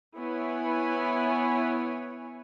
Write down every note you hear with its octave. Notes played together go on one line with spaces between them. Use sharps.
B3 E4 B4 C#5 G#5